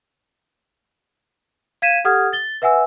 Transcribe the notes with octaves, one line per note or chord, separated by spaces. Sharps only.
F5 G#6 B6 D#7 E7
G4 A4 F#5 D#6 F6 G#6
A6 G7
B4 E5 F#5 G#5 E6